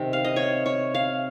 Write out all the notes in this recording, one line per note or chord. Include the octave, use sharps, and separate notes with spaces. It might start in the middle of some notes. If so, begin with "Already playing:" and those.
Already playing: C3 D#3 G3 C4
F5
D#5
C#5
C#5
F5